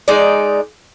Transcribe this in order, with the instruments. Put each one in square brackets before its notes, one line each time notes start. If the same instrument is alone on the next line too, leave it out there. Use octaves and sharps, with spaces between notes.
[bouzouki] G#3 D#4 D5